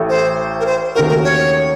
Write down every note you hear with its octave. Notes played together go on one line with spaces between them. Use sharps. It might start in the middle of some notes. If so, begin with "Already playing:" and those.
Already playing: A1 A2 A3
C5
A#4
C5
D#2 D#3 A3 C#4 F#4 A#4
A#4
C#5